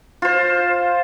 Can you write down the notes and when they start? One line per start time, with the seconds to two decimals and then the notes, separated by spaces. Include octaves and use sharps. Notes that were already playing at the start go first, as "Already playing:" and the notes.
0.22 F4 C5